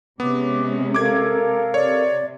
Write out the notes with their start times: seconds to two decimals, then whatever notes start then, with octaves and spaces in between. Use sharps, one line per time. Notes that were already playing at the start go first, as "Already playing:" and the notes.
0.20 C3 G#3 B3 C#4 D6
0.94 A4 A#4 F5 D6 G#6
1.74 C3 C#5 D5